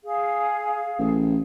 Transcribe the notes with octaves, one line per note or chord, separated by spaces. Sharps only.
G#4 F5
A1